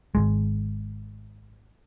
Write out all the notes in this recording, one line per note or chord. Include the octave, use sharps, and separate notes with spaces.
G#1 E2 G#3